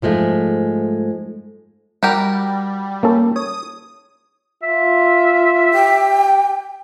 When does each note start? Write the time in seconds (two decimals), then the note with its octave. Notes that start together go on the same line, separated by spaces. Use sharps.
0.02 G#2 F3 G#3 A3
2.03 G3 F#4 G4 A#4
3.03 A#3 C#4 A4
3.36 C#5 D#6
4.63 F4 E5
5.74 G4 G5